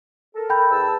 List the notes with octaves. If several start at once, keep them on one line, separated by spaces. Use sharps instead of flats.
A4 A#4
G5 B5 G6
E2 A5 E6